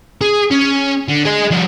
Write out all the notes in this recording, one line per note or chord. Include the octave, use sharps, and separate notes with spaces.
G#4
C#4
D3
G#4 D#5
F3 G3